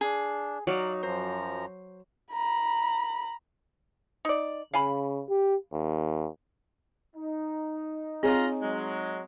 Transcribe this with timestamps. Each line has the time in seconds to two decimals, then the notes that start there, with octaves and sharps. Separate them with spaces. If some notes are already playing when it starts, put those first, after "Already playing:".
0.01 D4 G#4
0.67 F#3 D#4 D5 F5 D6
1.03 F#2 F3 C5 A#5
2.33 A#5 B5
4.25 D#4 D5
4.74 C#3 F5 G#5 B5
5.29 G4
5.73 D#2
7.16 D#4
8.23 C4 F4 G#4 C#5 D#5 A#5
8.62 F#3 G#3